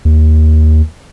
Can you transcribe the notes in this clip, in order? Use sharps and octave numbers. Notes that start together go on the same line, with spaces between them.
D#2